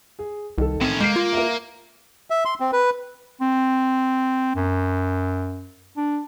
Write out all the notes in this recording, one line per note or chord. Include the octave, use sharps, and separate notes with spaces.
G#4
C2 D#3 A4
A2 C4 C#4
G#3 A#3 G6 C7
F4
A#4 E5
E5
C6
C4
B4
C4
F#2
D4